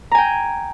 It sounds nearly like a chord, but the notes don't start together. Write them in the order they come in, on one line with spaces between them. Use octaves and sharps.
A#5 G#5 G5